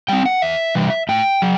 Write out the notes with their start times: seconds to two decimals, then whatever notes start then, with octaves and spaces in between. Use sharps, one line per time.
0.09 G3 C4 G5
0.26 F#5
0.42 E2 E5
0.75 C3 E3 G3
1.09 A2 G5
1.42 F#3